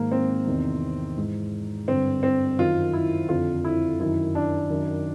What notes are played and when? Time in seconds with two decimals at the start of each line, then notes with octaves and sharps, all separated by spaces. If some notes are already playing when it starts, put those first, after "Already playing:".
Already playing: G#2 D#3 A#3
0.12 C4
0.47 E2 C3 D#3
1.18 G#2 E3
1.88 G2 D3 C4
2.23 C4
2.59 F#2 D#3 F4
2.93 E4
3.29 F2 D3 F4
3.65 E4
3.99 F#2 D#3 E4
4.35 D4
4.70 F#2 D#3